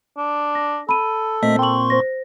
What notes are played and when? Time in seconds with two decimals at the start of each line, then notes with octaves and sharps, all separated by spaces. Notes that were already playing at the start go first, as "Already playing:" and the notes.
0.17 D4
0.55 A#6
0.89 A4 B5 D#7
1.43 A#2 A3 C4 D#5 B6
1.59 G5 C6 C#6 F#7
1.90 C5 A#6